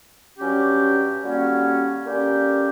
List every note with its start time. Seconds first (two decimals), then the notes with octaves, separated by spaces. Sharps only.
0.38 G2 F#3 C#4 G4
1.22 D3 G3 A#3 C#4 F#4
2.05 D3 A#3 C#4 G4